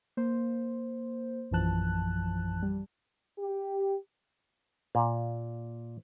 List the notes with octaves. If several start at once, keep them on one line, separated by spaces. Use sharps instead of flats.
A#3 C5
A#1 F#2 E3 F3 A5 F#6
G3
G4
A#2